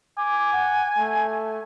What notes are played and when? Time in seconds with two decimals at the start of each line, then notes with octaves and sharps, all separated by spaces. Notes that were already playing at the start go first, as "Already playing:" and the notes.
0.18 G#5 D6
0.53 F#5
0.99 A3